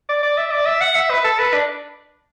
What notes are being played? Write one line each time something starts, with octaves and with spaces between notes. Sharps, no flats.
D5
D5
E5
D5
E5
F#5
E5
B4
A4
B4
D4